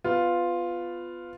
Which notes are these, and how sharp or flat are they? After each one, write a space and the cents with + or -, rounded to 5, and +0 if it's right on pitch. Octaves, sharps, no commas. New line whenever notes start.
B3 +20 F4 +0